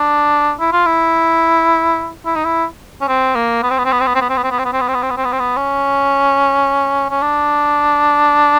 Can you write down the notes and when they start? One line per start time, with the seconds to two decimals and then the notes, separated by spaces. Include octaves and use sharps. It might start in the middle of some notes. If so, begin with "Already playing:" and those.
Already playing: D4
0.60 E4
0.72 F4
0.86 E4
2.26 E4
2.35 D#4
2.45 E4
3.01 C#4
3.08 C4
3.35 A#3
3.63 B3
3.70 C4
3.78 B3
3.85 C4
3.92 B3
4.00 C4
4.07 B3
4.15 C4
4.21 B3
4.29 C4
4.37 B3
4.44 C4
4.51 B3
4.59 C4
4.65 B3
4.73 C4
4.81 B3
4.88 C4
4.94 B3
5.03 C4
5.10 B3
5.17 C4
5.25 B3
5.32 C4
5.40 B3
5.56 C#4
7.10 C#4
7.22 D4